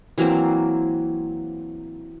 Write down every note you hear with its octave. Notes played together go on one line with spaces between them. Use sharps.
E3 F#3 A#3 C4